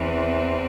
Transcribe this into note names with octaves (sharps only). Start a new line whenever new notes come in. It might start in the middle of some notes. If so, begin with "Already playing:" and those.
Already playing: E2 E3 C4